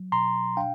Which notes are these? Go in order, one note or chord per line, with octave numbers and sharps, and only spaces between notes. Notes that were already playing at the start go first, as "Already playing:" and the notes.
Already playing: F#3
B2 A#5 C6
D4 F5 G5